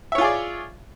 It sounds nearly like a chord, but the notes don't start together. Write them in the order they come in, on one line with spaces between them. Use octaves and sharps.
E5 C#5 F4 G#4 D5